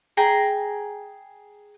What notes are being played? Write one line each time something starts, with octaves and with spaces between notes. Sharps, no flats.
G#4 G5 A#5